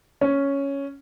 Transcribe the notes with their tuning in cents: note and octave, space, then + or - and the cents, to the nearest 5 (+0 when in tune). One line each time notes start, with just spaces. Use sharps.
C#4 +0